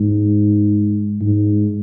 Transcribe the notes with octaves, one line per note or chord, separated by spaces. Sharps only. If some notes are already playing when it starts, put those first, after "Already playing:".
Already playing: G#2
G#2